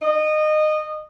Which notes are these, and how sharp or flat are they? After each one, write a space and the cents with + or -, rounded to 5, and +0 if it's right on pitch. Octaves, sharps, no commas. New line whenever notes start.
D#5 -20